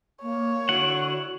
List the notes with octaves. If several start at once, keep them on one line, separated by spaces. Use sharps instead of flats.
A#3 C#5
D3 E4 F#4 F#5